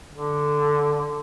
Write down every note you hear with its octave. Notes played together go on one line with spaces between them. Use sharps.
D3